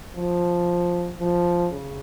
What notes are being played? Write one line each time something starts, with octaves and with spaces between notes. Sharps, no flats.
F3
F3
C#3